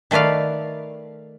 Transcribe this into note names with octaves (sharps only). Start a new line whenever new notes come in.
D#3 A3 B4 D5 F5